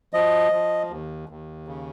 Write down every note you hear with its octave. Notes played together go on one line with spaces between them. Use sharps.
F3 D#5
F3
D#2
D#2
C#3